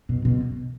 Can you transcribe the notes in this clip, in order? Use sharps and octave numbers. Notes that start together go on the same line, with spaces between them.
B2
B2